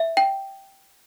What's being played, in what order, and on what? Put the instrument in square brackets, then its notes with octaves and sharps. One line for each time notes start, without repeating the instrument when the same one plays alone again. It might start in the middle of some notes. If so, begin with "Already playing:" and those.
Already playing: [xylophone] E5
G5